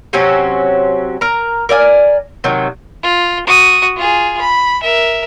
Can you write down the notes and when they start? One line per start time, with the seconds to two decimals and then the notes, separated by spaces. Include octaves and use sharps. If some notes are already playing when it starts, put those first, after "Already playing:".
0.13 C3 F#3 C4 C#4
1.21 A#4 A#5
1.69 A#4 D5 E5 G#5
2.44 C3 D#3 F#3
3.03 F4
3.47 F#4 D#6
3.97 F4 G#4
4.41 B5
4.82 A#4 E5